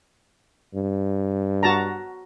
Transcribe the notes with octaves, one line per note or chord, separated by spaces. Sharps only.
G2
F#4 A5 A#5